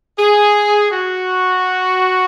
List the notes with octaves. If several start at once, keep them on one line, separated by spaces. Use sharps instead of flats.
G#4
F#4